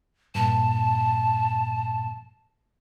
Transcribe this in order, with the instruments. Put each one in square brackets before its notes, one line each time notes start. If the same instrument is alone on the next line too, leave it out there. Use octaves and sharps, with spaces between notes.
[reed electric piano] G2 A#2 [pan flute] A5